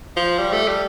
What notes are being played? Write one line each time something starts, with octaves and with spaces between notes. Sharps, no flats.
F3
G3
A3
G3